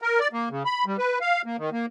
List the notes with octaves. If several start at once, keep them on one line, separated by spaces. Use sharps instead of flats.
A#4
D5
A#3
C#3
B5
G3
B4
F5
A#3
D#3
A#3